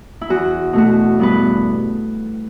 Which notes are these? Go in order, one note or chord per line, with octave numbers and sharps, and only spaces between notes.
E4
E2 F#4
B2 A3 F#4
G2 B3 B4